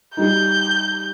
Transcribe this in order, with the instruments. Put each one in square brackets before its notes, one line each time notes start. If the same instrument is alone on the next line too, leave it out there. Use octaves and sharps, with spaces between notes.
[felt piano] G3 D#4 [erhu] G6